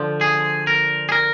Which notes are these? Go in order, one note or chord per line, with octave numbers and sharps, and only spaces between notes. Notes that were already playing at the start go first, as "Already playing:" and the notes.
Already playing: D3 F3
G#4
A#4
G#4
A#4